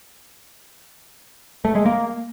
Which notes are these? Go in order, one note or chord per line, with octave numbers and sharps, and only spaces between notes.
A3
G#3
A#3